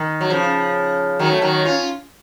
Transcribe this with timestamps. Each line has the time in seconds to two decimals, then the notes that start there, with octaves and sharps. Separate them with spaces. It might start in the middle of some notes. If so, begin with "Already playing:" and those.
Already playing: D#3
0.21 F#3
0.30 C#3 F3
1.19 D#3 F#3
1.31 A3
1.41 D#3 F#3
1.65 C#4 F4